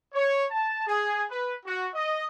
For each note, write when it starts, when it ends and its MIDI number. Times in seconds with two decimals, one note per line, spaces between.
0.12 0.44 73
0.50 0.83 81
0.86 1.23 68
1.28 1.54 71
1.64 1.87 66
1.93 2.23 75